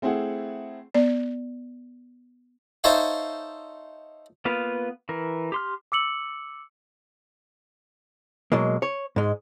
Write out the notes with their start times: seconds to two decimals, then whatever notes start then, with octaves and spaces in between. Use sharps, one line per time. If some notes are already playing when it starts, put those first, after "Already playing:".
0.02 A3 C4 E4 G#4 F#5
0.95 B3 D5
2.84 D#4 A4 C5 C#5 E5 F5
4.45 A#3 B3 F4 B4 F5
5.09 E3 A#4
5.52 G4 C6 F6
5.92 D6 E6 C#7 F#7
8.52 B2 F#3 G#3 A#3
8.82 C#5
9.16 G#2 G#3